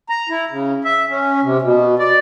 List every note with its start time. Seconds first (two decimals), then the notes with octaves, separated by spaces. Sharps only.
0.09 A#5
0.29 E4
0.50 C#3
0.85 E5
1.09 C#4
1.43 C3
1.62 B2
1.99 D5